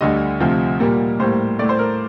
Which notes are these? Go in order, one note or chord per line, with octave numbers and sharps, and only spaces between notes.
D2 D3 G3 D#5
D2 C3 F3
A#2 G3 A#3
A2 G3 A#3 C5
A2 A3 D5
C5
A#4